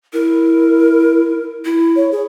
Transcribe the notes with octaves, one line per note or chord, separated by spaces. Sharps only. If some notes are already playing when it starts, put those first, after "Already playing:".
E4 A#4
E4
C#5
G#4